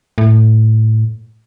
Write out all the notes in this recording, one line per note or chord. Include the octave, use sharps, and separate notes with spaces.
A2